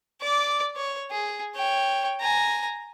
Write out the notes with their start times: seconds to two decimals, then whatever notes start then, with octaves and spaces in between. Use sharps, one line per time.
0.21 D5 D6
0.76 C#5
1.11 G#4
1.56 C#5 G5
2.21 G#5 A#5